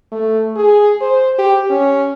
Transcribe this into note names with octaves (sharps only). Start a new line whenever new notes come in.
A3
G#4
C5
G4
C#4